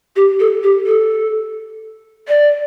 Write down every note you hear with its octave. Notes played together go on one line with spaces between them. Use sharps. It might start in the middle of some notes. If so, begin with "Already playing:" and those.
G4
A4
G4
A4
D5